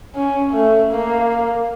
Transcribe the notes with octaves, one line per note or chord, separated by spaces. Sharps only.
C#4
A3
A#3